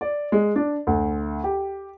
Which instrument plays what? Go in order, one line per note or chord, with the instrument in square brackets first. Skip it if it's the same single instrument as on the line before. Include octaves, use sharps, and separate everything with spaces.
[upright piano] D5
G#3
D4
D2
G4